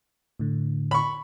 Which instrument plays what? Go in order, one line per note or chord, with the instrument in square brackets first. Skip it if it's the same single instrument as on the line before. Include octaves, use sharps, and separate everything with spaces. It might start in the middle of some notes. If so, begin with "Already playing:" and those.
[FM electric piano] A2 D3
[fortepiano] B5 C#6